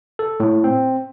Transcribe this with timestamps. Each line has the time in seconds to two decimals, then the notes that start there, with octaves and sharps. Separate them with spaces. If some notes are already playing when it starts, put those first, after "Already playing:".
0.19 A4
0.40 A2
0.64 C4